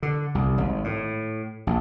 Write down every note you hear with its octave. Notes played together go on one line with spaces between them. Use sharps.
D3
C2
G#1
A2
A#1